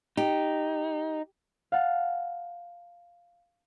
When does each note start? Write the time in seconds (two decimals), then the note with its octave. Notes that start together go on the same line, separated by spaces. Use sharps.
0.17 D#4 G4
1.72 F5 F#5 A5